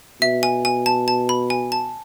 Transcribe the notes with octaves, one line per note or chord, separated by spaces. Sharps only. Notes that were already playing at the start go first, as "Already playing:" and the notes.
B2 E5
G#5
G#5
A5
A5
B5
G#5
A5